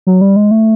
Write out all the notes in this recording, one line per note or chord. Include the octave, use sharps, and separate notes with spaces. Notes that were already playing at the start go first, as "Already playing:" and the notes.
F#3
G3
G#3
A3